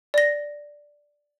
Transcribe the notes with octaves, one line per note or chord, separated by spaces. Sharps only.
D5 A#6